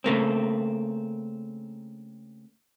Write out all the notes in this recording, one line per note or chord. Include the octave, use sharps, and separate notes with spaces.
C#3 A3 A#3 C4